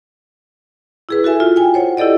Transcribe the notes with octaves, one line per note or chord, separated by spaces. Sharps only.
E4 G#4 B4
F#4 A4 E5 G#5
F4
G5 G#5
C5 C#5 F#5
E4 G4 A4 D5 D#5